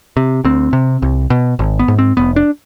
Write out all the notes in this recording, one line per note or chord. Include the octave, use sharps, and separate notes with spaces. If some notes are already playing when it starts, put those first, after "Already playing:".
C3
D2 C4
C3
C2
B2
G#1
B3
G#2
C4
F1 B3
D4